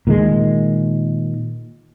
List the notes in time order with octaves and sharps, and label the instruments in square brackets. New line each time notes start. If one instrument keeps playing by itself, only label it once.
[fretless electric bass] A#2 D#3 G#3